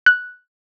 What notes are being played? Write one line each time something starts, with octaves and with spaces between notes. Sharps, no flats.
F#6